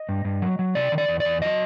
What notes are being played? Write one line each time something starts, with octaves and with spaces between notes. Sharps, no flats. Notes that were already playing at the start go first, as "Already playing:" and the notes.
Already playing: D#5
G2
G2
F#3
F#3
C3 D5
D#3
D5
E2
D5
E2
F#3 D#5